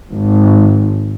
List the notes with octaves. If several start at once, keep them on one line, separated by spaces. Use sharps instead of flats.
G#1